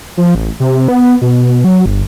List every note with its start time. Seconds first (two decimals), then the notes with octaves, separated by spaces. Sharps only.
0.17 F3
0.35 A1
0.60 C3
0.88 B3
1.22 B2
1.64 F#3
1.86 G1